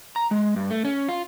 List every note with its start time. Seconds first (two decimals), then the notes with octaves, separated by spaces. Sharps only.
0.16 A#5
0.31 G#3
0.56 G2
0.70 A3
0.85 C#4
1.09 F4